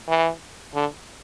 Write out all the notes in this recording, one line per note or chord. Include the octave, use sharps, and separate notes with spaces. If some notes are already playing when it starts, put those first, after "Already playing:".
E3
D3